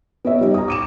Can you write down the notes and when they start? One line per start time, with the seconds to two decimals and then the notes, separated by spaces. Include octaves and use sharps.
0.25 B3 C#5 E5
0.41 G3 D#4
0.54 A#5 D#6
0.68 D6 D#7 E7